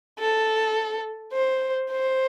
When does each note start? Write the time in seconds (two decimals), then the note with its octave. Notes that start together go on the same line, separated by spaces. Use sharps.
0.19 A4
1.33 C5
1.91 C5